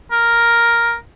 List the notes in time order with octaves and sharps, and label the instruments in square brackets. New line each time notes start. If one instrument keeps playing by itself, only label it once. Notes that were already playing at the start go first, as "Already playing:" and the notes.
[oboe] A#4